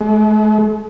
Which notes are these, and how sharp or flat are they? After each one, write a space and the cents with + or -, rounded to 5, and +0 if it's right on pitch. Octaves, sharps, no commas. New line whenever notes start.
G#3 +45